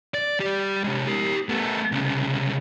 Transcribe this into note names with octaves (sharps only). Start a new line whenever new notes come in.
D5
G3 G4
C3 G#3
G4 A#4
A3 B3
C2 C#3